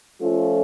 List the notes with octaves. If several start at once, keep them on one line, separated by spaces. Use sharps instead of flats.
F3 A3 C#4 F4 A4